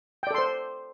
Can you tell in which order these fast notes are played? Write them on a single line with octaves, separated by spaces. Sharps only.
G5 D5 A4 C6 C5